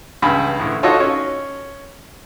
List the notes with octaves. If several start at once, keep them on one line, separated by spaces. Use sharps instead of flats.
C#2 G2 G#5 B5
D2 A2
D#4 F4 F#4 A4 C#5 D#5
C#4